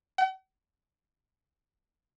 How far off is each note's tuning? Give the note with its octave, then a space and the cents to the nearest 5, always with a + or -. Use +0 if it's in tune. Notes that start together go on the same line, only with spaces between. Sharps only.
F#5 +45